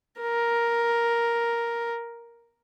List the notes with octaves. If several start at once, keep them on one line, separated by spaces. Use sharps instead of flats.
A#4